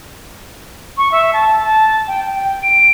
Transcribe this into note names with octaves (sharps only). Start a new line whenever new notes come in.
C#6
E5
A5
A5
G5
G5
D7